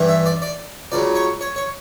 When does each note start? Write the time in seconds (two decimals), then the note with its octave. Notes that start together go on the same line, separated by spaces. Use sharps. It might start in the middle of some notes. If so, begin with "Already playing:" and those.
Already playing: G2 E3 G3
0.09 E5
0.26 D5
0.42 D5
0.92 C#2 C#3 F#3 D5
1.15 C#5
1.41 C#5
1.56 C#5